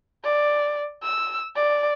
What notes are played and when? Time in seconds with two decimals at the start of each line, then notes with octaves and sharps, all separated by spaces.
0.25 D5
1.03 E6
1.56 D5